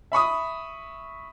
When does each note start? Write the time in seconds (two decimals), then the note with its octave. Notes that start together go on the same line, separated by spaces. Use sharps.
0.12 E5 B5 C#6 D#6